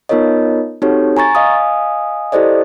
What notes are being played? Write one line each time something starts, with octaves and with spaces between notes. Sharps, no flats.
B3 D#4 F4 A#4 C#5 D#5
C4 D#4 F#4 G4 A4 C#5
G#5 A#5 C#6 A6
D#5 F5 G#5 D#6
E4 G4 A4 C5 D5 D#5